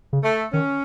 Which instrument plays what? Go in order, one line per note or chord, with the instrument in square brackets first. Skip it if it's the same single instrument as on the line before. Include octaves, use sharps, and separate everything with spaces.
[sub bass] C#3
[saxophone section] A3
[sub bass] D#3 [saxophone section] C#4